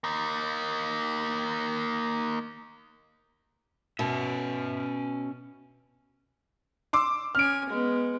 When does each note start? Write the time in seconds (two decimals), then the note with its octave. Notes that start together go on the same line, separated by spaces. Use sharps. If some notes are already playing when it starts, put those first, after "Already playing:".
0.04 A#3 D#4
3.99 B2 C#4 E5
6.93 C6 D6 E6
7.35 C#4 G#5 F6 D7
7.69 G#3 B3